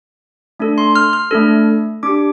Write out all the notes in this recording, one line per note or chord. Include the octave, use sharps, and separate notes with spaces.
A3 D4 A4
C6
F6
F6
A3 D4 A4
D4 G4 D6